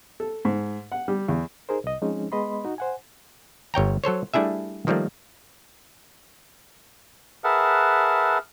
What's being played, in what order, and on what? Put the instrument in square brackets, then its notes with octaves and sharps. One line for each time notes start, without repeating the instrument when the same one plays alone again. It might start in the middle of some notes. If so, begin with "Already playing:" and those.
[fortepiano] A4
G#2
F#5
G3
E2
[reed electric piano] D#4 G#4 A#4 C5
C2 D#5
F3 G#3 C4 C#4 D#4
G#3 B3 D#5 B5 C6
D#4 F#4
C5 F#5 G#5
[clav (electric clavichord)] G1 C#5 G5 A#5
F#3 A4 C5 C#5
G3 A3 D4 E4 G#4 E5
D#3 F3 G3 A3 A#3
[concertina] G#4 A#4 B4 E5 F#5 A5